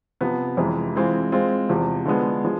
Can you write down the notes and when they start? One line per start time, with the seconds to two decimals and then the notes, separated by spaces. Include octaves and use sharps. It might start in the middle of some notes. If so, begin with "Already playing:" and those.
0.21 C3 F3 B3
0.57 F2 C3 E3 G#3
0.96 E3 G#3 C4 F4
1.32 G#3 C4 F4
1.69 E2 C3 F3
2.06 D3 F3 G#3 B3
2.45 F3 G#3